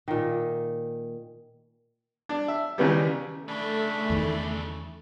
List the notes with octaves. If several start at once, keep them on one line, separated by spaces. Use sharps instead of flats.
A#2 D#3
D4
E5
D#2 C#3 E3 G3
C#3 E3 A3 D4 D5 B5
E2 D#3